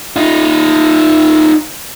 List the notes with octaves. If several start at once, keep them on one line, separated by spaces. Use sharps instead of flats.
D#4 F4